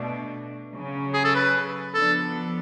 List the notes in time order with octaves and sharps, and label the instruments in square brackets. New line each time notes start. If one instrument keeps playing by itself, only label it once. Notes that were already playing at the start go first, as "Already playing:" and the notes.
Already playing: [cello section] B2 A3 D4
C#3 F#3 C#4
[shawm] G#4
A4
B4
[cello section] F3 B3 D4 [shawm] A4